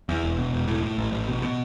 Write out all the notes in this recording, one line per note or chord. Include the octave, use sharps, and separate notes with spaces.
E2
E1
B2
E1
A2
A2
A1
A1
B2
B2